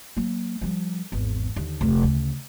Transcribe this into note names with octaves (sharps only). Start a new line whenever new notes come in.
F#3 A#3
F3 G3
G#1 E2
D#2 D3
F1 D2
D2 C#3